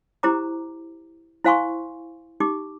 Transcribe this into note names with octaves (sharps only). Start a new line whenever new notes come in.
E4 G4 C5 A#5 D6
E4 C5 F5 G#5 C6 C#6
D#4 G4 D6